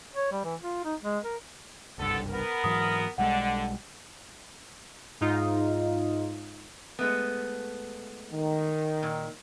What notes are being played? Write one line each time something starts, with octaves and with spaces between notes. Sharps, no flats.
C#5
G3
E3
F4
D#4
G#3
A#4
F#1 C2 G2 D3 B3 A4
B3 A#4
G#2 E3 F#3 D#6
B1 D3 G3 G#3 F#5
G#2 D#4 F4
G#3 A3 B3
D#3
A#2